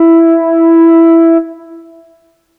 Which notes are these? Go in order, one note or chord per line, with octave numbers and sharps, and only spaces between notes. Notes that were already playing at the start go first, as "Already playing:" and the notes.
Already playing: E4